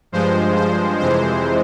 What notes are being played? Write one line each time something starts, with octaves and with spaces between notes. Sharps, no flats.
G2 F3 G#3 C5
C5
F2 C3 E3 G#3 C5